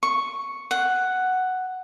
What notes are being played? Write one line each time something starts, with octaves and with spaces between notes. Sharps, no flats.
C#6
F#5